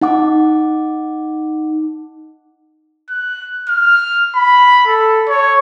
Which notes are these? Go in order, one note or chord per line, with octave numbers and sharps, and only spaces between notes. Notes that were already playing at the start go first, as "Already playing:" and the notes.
D#4 F#5 D6
F#6
F6
B5
A4
C#5